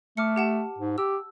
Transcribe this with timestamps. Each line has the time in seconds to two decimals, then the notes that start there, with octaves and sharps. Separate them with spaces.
0.17 A3 D6 F6 C#7
0.36 G4 F#5 A5
0.78 G#2
0.98 G4 E6